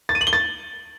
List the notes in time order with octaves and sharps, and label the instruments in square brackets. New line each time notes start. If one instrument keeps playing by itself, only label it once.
[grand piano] A6
D#7
F#7
G7
A6